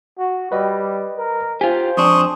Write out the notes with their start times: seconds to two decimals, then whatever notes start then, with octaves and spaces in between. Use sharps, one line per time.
0.19 F#4
0.52 G3 B4 D#5
1.17 A#4
1.61 F4 G4 C5 G#5
1.97 F2 D4 C6 C#6 D#6